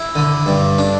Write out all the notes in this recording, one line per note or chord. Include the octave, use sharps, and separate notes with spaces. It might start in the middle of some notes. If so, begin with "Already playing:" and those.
Already playing: E4
D3
G2
D4